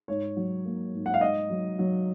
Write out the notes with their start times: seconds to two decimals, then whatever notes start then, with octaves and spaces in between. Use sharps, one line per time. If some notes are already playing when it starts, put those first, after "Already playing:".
0.08 G#2 C#5
0.36 F#3
0.65 A#3
0.93 G#2
1.06 F#5
1.14 F5
1.21 G#2 D#5
1.50 F#3
1.79 F#3